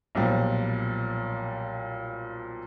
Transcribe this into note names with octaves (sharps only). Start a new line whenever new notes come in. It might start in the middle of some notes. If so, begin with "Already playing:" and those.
B1 A#2 F3 G3